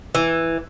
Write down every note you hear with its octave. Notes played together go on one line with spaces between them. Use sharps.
E3